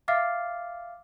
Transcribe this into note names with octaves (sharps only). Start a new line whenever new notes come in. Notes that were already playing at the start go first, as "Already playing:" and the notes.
E5 F5 D6 F6 A6 C7